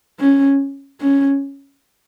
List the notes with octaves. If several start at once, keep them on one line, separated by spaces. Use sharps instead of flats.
C#4
C#4